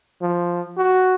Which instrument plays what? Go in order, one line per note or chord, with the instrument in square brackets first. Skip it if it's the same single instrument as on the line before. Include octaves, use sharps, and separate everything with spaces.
[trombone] F3
F#4